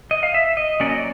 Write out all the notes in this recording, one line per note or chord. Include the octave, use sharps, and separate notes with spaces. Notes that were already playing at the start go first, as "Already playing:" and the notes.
D#5
F5
E5
D#5
F#3 A#3 C#4 D5
D#5
D5